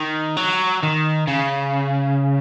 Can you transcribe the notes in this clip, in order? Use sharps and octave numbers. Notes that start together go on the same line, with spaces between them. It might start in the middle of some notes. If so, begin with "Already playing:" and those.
Already playing: D#3
F#3
D#3
C#3